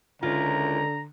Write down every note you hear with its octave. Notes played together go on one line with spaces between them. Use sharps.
C#2 D3 E4 F4 A#4 A#5